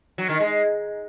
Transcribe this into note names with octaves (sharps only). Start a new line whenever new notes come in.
F#3
D#3
G#3